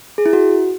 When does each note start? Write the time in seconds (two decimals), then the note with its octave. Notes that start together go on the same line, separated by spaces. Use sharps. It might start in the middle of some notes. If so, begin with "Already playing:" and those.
0.18 G#4
0.26 E4
0.33 F#4